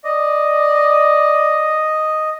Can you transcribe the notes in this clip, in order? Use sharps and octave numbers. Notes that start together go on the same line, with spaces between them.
D5 D#5